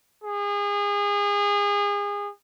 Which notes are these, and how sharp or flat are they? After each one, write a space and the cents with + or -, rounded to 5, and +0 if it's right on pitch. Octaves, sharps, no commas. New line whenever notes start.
G#4 -30